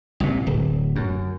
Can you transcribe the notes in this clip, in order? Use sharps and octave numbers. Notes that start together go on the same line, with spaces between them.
C2 A#2
D1
F#2